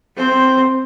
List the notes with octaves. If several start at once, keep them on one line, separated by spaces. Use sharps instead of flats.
C4 C5